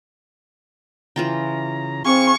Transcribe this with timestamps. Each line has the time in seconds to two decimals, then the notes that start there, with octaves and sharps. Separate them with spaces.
1.16 C#3 E3 F4 G5 A#5
2.05 C4 G#4 F5 G#5 C#6